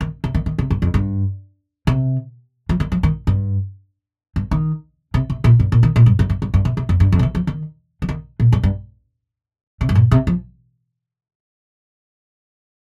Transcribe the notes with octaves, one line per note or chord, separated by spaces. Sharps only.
D#3
C3
D#3
D#3
C3
G2
F2
G2
C3
F3
D#3
F3
D#3
G2
G2
D#3
C3
C3
A#2
G2
A#2
D#3
A#2
G2
G2
G2
G2
G2
C3
C3
F2
G2
F2
C3
D#3
F3
D#3
F3
D#3
A#2
G2
G2
C3
G2
A#2
C3
F3